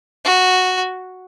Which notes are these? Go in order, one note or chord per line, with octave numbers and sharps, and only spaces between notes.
F#4